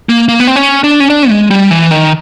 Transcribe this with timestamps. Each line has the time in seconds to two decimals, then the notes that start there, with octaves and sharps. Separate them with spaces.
0.09 A#3
0.29 A#3
0.40 B3
0.47 C4
0.56 C#4
0.84 D4
1.00 C#4
1.10 D4
1.30 G#3
1.51 G3
1.71 E3
1.91 D#3